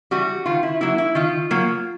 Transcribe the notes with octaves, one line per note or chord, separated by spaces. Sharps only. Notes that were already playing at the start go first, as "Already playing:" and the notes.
E3 G3 F#4
D#3 F4
E4
F#3 A#3 E4
E4
D#3 F4
F#3 A#3